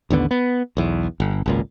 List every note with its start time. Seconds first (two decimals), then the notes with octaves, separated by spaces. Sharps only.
0.10 A1 D#2 D3 B3
0.31 B3
0.77 B1 E2
1.20 G1
1.46 G#1 C#2 A#2